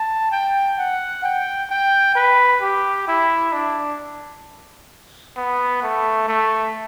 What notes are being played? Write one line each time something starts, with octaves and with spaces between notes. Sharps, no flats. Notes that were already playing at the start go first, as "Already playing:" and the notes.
Already playing: A5
G5
F#5
G5
G5
B4
G4
E4
D4
B3
A3
A3